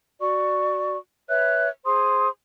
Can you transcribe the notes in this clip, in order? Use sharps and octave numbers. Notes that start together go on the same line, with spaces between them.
F#4 D5 C#6
B4 C#5 E5 F#6
G#4 C5 C6 D#6